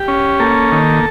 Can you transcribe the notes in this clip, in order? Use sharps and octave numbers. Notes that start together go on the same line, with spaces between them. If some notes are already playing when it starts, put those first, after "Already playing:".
Already playing: G4
C#4
A#3 A4
D#3